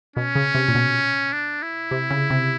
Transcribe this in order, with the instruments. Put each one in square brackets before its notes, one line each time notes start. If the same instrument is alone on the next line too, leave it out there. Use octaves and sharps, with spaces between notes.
[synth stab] B2 [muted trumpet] C#4
[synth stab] C#3
C3
A#2
B2
[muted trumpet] D4
E4
[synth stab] C3
C#3
C3